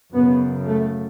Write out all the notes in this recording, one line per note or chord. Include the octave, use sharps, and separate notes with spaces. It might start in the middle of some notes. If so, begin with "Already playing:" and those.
F#2 C#3 B3
A3